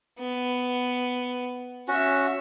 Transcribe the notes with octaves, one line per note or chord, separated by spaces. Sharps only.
B3
C#4 F#4 C#5 E5